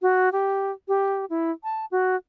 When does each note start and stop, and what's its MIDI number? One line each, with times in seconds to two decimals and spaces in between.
0.02 0.29 66
0.32 0.72 67
0.88 1.25 67
1.30 1.51 64
1.63 1.85 81
1.91 2.16 66